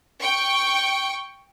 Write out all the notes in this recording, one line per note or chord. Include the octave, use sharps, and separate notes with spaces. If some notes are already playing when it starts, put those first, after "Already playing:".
G5 C#6